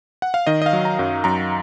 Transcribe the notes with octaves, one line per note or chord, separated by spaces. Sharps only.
F#5
F5
D#3 D#5
D#5
F5
F#3
A#5
F#2
F#2 A#5